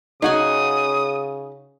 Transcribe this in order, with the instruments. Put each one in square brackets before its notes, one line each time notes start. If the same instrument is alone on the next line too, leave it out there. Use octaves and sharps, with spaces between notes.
[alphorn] C#3 [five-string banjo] D#4 F#4 [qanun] G#4 F#5 G#5 [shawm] D#6